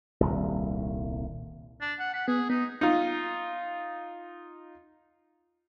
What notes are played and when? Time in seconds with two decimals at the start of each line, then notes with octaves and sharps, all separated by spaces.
0.21 D#1 C2
1.81 D4
2.00 F#5
2.14 F#5 B6
2.28 B3 G#4
2.50 B3 D#4
2.81 D#4 F4